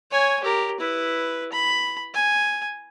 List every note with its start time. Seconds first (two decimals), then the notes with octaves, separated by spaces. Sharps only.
0.11 C#5 G#5
0.43 G4 A#4
0.80 E4 B4
1.52 B5
2.14 G#5